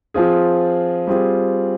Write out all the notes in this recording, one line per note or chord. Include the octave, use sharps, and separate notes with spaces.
F3 C4 F4 G#4
G3 C4 F4 G#4